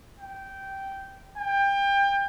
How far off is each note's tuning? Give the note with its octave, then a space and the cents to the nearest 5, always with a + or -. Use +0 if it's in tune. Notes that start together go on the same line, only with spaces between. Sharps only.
G5 -10
G5 +25